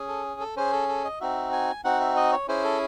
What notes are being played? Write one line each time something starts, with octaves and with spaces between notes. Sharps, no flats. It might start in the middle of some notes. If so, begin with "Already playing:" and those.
Already playing: C#4 G#4
A4
A4
C#4 G#4 C5
A4
A4
D#5
C4 D#4 F#4 E5
G#5
C4 D#4 F#4 F#5
E5
D#5
C#5
C#4 E4 G#4 C5
A4